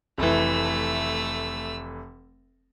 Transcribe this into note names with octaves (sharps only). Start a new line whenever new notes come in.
F1 E3 A3 E6